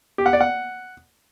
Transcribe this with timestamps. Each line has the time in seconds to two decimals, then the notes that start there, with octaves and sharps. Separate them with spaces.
0.18 G4
0.26 F#5
0.33 D5
0.41 F#5